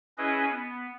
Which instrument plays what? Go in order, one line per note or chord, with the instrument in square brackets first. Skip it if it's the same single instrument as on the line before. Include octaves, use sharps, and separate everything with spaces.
[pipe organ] C#4 E4 G#4 B4 D#5
B3